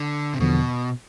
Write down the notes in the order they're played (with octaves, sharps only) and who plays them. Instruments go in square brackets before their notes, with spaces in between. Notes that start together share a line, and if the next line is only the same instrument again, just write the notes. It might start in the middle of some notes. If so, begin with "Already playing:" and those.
Already playing: [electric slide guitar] D3
C3
[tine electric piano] E2 D3 F3 B3 [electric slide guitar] B2